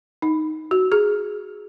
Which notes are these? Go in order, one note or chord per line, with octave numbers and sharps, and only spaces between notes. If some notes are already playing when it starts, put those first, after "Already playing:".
D#4
F#4
G#4